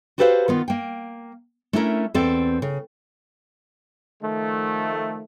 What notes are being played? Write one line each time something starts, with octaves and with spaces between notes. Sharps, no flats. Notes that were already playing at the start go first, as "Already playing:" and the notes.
F#4 G4 A4 B4 C5 F5
D#3 B3 F4
A#3 G5
A3 C#4 D4 E4 G#4 A#4
E2 C4 A4 D5
C#3
D#3 F3 A3